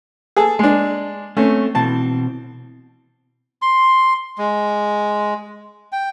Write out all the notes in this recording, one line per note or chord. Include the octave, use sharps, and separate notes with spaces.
G#4 A4
G#3 D4
A3 C4 C#4
B2 E3 C4 A5
C6
G#3
G5